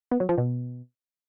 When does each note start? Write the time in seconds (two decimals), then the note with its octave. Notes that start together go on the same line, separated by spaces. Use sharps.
0.11 B3
0.20 F#3
0.29 F3
0.38 B2